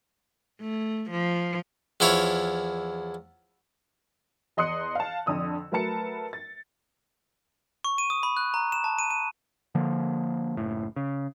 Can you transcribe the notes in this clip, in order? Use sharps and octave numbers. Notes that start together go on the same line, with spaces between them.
A3
F3
E2 F3 E4 C#5
E2 D#5 C6 D#6 F#6 C#7
F5 A5
F2 D3 D#6 E6
F#3 A3 A#4 B4 A5 C#7
A6
C#6
D#7
D#6
B5
F#6
A#5
E7
A5
D#7
D#7
D3 F3 A#3
F#1 A2
C#3